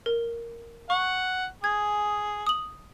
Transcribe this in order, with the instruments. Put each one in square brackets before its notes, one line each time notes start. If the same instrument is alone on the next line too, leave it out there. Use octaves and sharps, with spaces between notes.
[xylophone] A#4
[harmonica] F#5 [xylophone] C#6
[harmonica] G#4 [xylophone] G#6
[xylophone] D#6 F#7